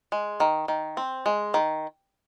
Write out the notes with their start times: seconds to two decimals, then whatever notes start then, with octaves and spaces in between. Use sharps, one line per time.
0.12 G#3
0.40 D#3
0.68 D#3
0.97 C4
1.26 G#3
1.54 D#3